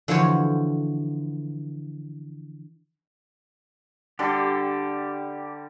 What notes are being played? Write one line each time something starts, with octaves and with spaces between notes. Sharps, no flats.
D3 E3 F3 F#4 C5 C#5
D3 G3 G4 A4